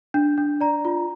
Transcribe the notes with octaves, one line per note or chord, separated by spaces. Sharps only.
D4
D4
D5 A#5
F4